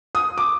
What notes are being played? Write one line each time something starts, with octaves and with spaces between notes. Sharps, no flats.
D#6
D6